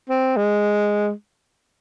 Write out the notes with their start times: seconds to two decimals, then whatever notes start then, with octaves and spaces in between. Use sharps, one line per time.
0.09 C4
0.37 G#3